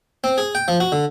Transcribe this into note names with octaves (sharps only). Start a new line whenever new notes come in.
C4
G#4
G5
F3
F#4
D3